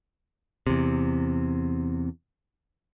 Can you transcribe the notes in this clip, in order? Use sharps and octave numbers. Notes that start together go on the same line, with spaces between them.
E2 C3